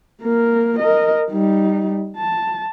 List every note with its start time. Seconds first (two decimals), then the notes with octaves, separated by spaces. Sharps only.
0.21 A#3 A#4
0.79 A#4 D#5
1.31 G3 D#4
2.17 A5